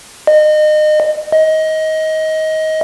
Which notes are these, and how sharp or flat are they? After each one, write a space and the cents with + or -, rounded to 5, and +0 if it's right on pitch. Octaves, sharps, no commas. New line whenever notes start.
D#5 -30
D#5 +20